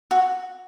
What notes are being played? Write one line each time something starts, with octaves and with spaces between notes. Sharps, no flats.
F#4